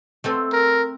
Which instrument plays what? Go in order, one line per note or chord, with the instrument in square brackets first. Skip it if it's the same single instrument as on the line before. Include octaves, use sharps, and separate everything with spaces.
[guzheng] A3 C4 A4
[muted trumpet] A#4